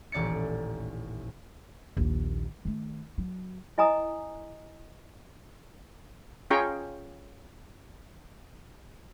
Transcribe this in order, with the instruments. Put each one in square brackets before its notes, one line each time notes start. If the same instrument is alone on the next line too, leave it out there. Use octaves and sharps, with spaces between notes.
[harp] D#1 A1 D5 A6 C#7
[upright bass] A#1 D#2
D#3 A3
F#3
[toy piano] E4 D#5 G#5 A#5 D#6
[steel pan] C#4 F4 G#4 G5 A#5 C#6